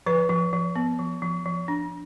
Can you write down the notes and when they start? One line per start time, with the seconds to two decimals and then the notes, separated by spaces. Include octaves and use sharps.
0.06 F3 B4
0.29 F3
0.53 F3
0.76 B3
0.99 F3
1.22 F3
1.46 F3
1.68 D4